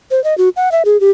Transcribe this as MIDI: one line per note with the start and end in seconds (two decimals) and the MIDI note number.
0.11 0.22 72
0.24 0.37 75
0.38 0.49 66
0.56 0.71 78
0.72 0.83 76
0.85 1.00 68
1.00 1.10 67